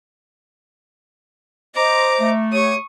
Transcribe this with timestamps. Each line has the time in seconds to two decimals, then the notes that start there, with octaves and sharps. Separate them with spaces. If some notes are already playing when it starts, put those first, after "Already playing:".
1.75 C5 D#5 A#5 D6
2.21 A3
2.51 G4 C#5 C#6 D#6